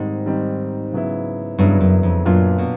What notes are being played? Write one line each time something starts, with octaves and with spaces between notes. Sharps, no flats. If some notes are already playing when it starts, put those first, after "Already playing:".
Already playing: G#2 D#3 G3 C4 D#4
D#3 G3 C4 D#4
C#3 F#3 B3 E4
G2 C#3 F#3 B3 E4
F#2
F2
F#2 A#2 F#3 B3 D4 F4
B2